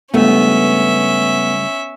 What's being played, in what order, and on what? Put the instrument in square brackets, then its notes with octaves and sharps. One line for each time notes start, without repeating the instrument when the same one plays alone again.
[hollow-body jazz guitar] C#2 G2 A3 [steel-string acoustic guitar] B3 [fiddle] C#4 E5